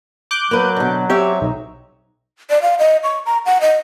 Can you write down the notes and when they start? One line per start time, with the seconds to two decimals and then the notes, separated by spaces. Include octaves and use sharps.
0.31 D6 F#6 G6
0.51 F#3 A#3 B4
0.76 B2 D3
1.10 C4 G4 C#5 E5
1.41 B1 D#4
2.50 D5
2.62 F5
2.79 D#5
3.04 C#6
3.26 A#5
3.46 F#5
3.61 D#5